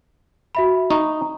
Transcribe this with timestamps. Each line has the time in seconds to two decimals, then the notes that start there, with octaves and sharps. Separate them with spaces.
0.55 F#4 E5 B5
0.90 D#4 A#5 C#6